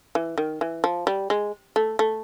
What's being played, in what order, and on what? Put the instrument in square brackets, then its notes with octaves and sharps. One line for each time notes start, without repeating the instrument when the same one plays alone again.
[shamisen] E3
D#3
E3
F3
G3
G#3
A3
A3